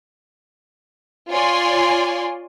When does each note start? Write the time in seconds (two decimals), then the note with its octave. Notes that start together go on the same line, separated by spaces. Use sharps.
1.30 F4 C#5 D5 G#5 C6